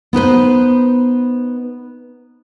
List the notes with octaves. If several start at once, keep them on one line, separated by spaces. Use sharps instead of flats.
B3 D#4 B4 C5